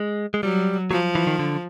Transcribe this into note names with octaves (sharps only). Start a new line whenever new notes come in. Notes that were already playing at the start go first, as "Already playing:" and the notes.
Already playing: G#3
G#3
F#3 G3
F3 F#3
E3
D#3
D3